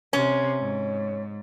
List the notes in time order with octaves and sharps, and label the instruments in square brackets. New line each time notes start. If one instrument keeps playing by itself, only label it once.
[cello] C3 [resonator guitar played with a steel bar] C#4
[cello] G#2